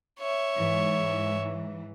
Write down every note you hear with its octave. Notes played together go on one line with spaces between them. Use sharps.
C#5 E5
G#2 E3